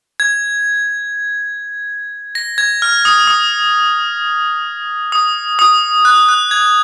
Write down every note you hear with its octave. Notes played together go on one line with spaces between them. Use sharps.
G#6
A#6
G#6
F6
D#6
D#6
D#6
D#6
F#6
F#6
G#6